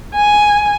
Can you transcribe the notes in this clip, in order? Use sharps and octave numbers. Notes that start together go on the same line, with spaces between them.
G#5